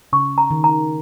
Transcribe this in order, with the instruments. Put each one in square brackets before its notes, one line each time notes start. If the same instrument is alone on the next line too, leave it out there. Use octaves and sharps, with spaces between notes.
[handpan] C#3 [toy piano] C#6
[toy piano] A#5
[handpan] D#3
[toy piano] A#5